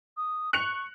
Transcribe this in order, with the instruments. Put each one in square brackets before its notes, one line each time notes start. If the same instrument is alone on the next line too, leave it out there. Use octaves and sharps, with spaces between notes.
[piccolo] D#6
[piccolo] C#6 [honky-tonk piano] F#6 C#7 F7